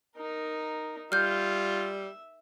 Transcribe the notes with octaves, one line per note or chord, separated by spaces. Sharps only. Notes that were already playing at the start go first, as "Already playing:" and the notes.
D#4 A#4
G3 F4 E5 F6 G6